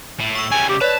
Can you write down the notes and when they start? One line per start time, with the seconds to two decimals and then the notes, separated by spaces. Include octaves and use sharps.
0.20 A2
0.35 C#6 E6
0.51 C#3 G3 G#5
0.69 G4
0.81 B4 C#5 D5 A5